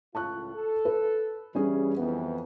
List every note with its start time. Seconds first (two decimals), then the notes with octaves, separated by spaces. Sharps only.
0.15 C#2 A2 F4 A5 C#6 F#6
0.55 A4
0.85 B4
1.55 G2 C#3 E3 G3 C#4 G#4
1.97 F2 E3 B3